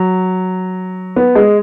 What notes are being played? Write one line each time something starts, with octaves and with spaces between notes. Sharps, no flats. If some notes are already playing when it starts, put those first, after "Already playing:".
Already playing: F#3
B3
G#3